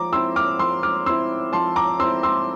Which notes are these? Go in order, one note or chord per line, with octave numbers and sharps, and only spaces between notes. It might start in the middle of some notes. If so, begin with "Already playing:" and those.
Already playing: F3 A#5 D6
C4 E4 C6 E6
D6 F6
F3 C6 E6
D6 F6
C4 E4 C6 E6
F3 A5 C6
A#5 D6
C4 E4 C6 E6
C6 E6